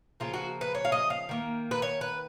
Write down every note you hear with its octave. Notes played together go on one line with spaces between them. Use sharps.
C#3 F3 A#3 F4
F#4
B4
C#5
F5
D#5
F5
D#3 A#3
B4
C#5
B4